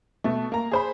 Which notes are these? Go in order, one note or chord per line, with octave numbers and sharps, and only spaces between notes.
B2 A3
A#3 A#5
G#4 C5 B5